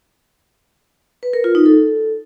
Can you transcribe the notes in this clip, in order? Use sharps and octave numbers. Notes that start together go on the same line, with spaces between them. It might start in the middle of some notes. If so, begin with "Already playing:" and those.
B4
A#4
F4
D#4
A4